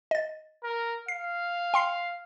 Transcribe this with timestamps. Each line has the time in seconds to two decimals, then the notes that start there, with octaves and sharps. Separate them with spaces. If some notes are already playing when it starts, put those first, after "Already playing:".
0.11 D#5 A6
0.63 A#4
1.08 F5 C7
1.74 G5 C6 C7